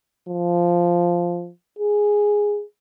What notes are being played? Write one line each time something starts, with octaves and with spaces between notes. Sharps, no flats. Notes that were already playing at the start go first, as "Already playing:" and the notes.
F3
G#4